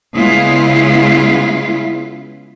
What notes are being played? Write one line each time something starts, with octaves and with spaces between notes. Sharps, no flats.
C#3 G#3 B3 E4 F4